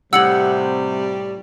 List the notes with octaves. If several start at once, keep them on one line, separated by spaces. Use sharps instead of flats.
A2 C3 G3 F#5 E6 C#7 F#7